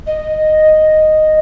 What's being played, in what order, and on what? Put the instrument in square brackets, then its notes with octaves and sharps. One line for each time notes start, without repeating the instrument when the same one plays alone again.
[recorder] D#5